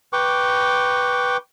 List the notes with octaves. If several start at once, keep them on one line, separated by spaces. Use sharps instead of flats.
B4 G5 C#6 D6